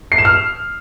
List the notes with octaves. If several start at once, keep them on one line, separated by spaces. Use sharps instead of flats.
C7
E7
F6